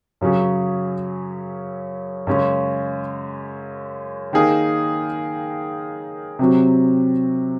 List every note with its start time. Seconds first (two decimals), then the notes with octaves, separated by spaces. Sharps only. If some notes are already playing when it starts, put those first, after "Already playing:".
0.21 F#2 C#3 F#3 C#4 G#4
2.27 F#2 C#3 G#3 C#4
4.33 D#3 A#3 D#4 G#4
6.39 C3 F#3 C4 F#4